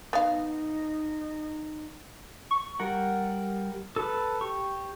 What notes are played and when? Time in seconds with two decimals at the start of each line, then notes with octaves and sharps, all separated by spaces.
0.13 B3 D#4 F5
2.51 C#6
2.80 G3 A#4 F#5
3.96 A4 B4
4.41 G4 C#6